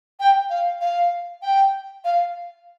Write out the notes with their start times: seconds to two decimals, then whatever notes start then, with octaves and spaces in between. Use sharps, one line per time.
0.20 G5
0.50 F5
0.81 F5
1.42 G5
2.04 F5